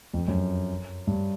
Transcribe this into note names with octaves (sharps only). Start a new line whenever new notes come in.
F2
F#2
G2